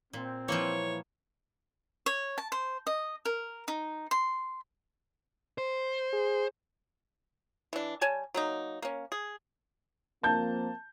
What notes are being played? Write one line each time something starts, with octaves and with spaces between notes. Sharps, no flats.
A#2 C4
E3 F3 G3 A#3 C#5
C#5
A5
C5
D#5
A#4
D#4
C6
C5
G#4
E3 D4
G3 C#5 G#5 A5
F#3 A#3 D#4
A#3 C#4
G#4
F3 A#3 C4 A5 G6